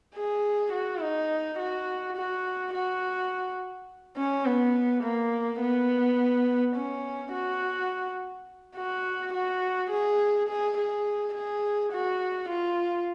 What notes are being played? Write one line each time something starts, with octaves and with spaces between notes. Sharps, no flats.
G#4
F#4
D#4
F#4
F#4
F#4
C#4
B3
A#3
B3
C#4
F#4
F#4
F#4
G#4
G#4
G#4
G#4
F#4
F4